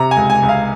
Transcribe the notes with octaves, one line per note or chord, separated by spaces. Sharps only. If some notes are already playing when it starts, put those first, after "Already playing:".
Already playing: C3 A#5
G#5
C#2
G#5
C#2
F5